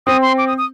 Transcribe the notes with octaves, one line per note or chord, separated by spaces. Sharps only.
C4 D#6
C6
D6
D#6
D#6